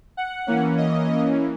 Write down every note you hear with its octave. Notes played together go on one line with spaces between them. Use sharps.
F#5
E3 A#3 C#4
D#5